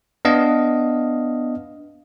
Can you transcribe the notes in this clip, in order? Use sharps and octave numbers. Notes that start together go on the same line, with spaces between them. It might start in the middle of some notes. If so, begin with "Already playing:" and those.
B3 D4 D#5 F5